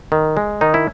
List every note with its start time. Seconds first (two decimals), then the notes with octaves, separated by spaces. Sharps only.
0.12 D#3
0.37 G#3
0.61 D#3 D#4
0.74 E4